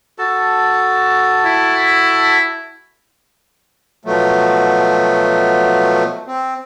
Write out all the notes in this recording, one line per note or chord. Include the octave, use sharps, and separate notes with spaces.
F#4 A4 A5
E4
B2 F3 F#3 A3
C4